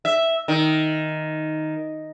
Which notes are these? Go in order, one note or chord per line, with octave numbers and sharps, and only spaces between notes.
E5
D#3